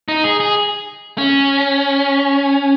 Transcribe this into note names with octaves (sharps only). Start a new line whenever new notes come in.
D#4
G#4
G#4
C#4